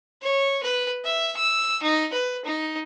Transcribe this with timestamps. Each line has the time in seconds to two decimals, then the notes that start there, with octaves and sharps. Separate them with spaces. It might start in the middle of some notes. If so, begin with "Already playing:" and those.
0.22 C#5
0.62 B4
1.04 E5
1.36 E6
1.82 D#4
2.13 B4
2.45 D#4